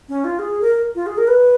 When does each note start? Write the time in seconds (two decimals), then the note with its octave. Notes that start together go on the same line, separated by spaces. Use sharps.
0.09 C#4
0.24 F4
0.39 G#4
0.61 A#4
0.95 F4
1.06 G#4
1.18 A#4
1.28 B4